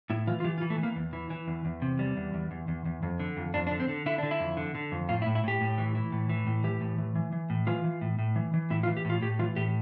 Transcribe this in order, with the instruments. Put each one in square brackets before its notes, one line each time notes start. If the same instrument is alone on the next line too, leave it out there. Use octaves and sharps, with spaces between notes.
[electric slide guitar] A2 E4
E3 F4
F4
E3 G4
F4
E3
A3
E3
A#3
E2
E3
E3
E2
E2
C3
E2 G3
E2
E2
E2
E2
E2
F2
D3
F2
F2 D4
D4
D3
C4
D3
D3 E4
D3 D4
E4
F2
D3
D3
F2
A2 F4
E4
A2
E4
A2 G4
A2
E3
E3
A2
E3
A2
E3 G4
A2
E3
E3
E3
A2
E3 F4
E3
A2
A2
E3
E3
A2 E4
F4
E3
G4
A2 F4
A2 G4
E3 F4
A2 G4